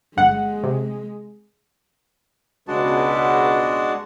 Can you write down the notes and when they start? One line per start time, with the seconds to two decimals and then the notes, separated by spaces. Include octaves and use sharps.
0.17 G1 G#3 F#5
0.63 C3
2.68 C#2 B2 G#3 D4 F#4 A5